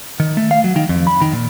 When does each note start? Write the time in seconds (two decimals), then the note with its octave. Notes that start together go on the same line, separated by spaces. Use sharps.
0.20 D#3
0.37 A3
0.51 F5
0.64 F#3
0.76 D#3
0.89 F2
1.07 B5
1.22 D#3
1.33 A#2